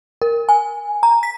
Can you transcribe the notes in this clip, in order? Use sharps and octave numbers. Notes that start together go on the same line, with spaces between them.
A#4
G#5
A#5
B6